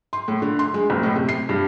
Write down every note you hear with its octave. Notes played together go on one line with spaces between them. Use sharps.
C6
A2
D3
C6
G#3
F#1
A2
C3
C7
G2